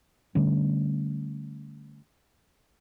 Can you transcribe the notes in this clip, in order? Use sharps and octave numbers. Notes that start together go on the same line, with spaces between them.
D3 G3 A3 C#4